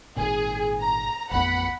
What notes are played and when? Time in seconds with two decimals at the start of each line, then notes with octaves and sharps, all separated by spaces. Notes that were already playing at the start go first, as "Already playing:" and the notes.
0.16 G#1 A#2 G#4
0.81 A#5
1.31 A1 F2 B3 F#5 B5